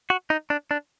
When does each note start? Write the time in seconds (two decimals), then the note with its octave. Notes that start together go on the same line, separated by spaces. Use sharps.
0.10 F#4
0.30 D#4
0.50 D4
0.71 D4